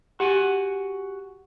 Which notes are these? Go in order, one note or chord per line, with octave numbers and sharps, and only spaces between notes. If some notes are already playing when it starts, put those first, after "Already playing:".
F#4 G4 F#5 G#5